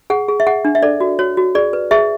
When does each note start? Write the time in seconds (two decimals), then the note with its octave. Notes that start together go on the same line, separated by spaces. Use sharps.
0.10 G#4 F#5
0.29 G#4
0.40 E5
0.46 G#4 F#5
0.65 D4
0.75 E5
0.83 A4 D5
1.01 F#4
1.19 F#4 C#5
1.37 F#4
1.55 G#4 D5
1.73 B4
1.91 G#4 E5